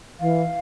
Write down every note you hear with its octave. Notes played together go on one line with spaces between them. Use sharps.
E3 F5